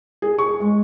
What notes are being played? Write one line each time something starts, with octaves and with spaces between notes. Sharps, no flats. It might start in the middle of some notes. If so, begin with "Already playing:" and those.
G#4
C#6
G#3